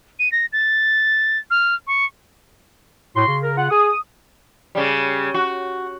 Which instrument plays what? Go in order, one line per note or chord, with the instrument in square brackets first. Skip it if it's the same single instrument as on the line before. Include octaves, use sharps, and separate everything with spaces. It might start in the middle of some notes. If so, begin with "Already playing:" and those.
[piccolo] D#7
A#6
A6
F6
C#6
[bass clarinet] A2 [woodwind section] F#4 C6
[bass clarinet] C#3
[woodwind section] A#4
F4 F#5
[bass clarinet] G#4 [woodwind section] D#6
[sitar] C#3 G3
F#4